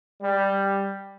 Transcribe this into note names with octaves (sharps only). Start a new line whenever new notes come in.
G3